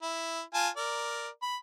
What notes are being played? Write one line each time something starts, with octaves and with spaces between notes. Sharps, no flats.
E4
F4 G#5 A5
A#4 D5
B5